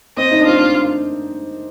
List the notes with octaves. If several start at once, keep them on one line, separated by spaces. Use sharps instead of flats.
C4 D#5
D#4
D4
C4 F4
D4